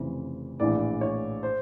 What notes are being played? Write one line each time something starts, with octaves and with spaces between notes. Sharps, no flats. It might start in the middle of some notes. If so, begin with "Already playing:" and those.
Already playing: F1 F2 C#3 E3
A#1 A2 E3 D5
C#5
C5